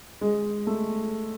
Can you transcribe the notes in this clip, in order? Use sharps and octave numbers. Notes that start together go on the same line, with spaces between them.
G#3
A3